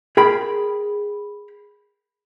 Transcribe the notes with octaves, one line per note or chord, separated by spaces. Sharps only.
G#4 A#4 G5 B5